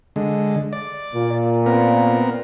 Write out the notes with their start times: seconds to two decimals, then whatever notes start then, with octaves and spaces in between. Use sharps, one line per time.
0.16 D3 G#3
0.73 D5
1.15 A#2
1.66 B3 C4 A#4